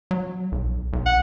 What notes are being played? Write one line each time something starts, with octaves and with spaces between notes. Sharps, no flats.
F#3
B1
B1
F#5